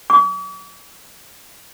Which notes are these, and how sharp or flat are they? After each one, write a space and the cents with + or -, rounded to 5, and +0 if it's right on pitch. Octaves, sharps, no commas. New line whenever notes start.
D6 -45